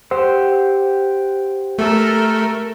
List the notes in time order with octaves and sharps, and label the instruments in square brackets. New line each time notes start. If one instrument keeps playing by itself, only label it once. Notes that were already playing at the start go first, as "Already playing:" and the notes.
[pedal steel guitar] G4 F#5 E6 [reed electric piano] C5
[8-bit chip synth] A3 [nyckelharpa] A4 A#4